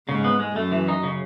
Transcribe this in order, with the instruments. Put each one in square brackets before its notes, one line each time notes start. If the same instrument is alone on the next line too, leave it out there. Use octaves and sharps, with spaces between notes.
[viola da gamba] G#2 [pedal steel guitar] C#3
[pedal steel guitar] B3
G#3
[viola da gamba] F#2 [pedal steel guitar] A3
[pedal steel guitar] E3
D#4
C#3